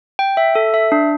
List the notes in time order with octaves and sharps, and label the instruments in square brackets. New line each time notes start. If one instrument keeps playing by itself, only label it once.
[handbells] G5
E5
A4
E5
D4